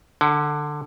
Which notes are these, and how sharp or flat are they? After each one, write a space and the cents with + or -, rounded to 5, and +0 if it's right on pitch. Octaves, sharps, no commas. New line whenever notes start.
D3 +15 F#5 +40